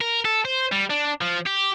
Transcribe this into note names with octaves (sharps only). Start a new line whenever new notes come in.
A#4
A4
C5
G3
D4
F3
G4